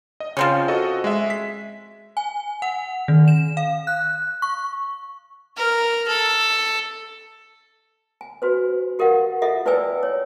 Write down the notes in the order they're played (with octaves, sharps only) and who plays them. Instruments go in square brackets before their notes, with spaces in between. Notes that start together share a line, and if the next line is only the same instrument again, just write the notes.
[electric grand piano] D#5
[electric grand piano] C#3 [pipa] F3 C4 C#4
[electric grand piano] F#4 A4 D#5
G#3 E5
B6
[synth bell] G#5
F#5
D#3
E7
F5
F#6
C#6
[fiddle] A#4
A4
[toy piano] G#5
F#4 B4 C5
G4 A#4 D#5 F5 F#5
F4 A4 D#5 E5 F#5
E4 B4 D5 G5 G#5 E6
C#5